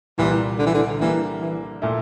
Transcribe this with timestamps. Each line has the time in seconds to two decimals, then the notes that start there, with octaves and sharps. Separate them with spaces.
0.18 C2 A#2 E3 G3 A#3
0.59 D3
0.66 E3
0.74 D3
1.00 D3 E3 G3 A#3
1.41 E3
1.82 A#2 A3 E4